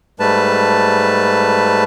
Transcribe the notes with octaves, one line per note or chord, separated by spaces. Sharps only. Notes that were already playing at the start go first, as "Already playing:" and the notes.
G#2 G3 A3 B4 A5